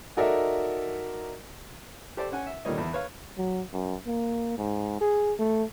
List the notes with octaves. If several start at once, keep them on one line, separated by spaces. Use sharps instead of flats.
D#4 F#4 A4 A#4 D5 E5
G4 A4 C5 D5
C#4 F#5 G#5
E5
A#2 D3 D#3 G3 C#5 D#5
E2
B4 C#5 F5
F#3
F#2
A#3
G#2
G#4
A3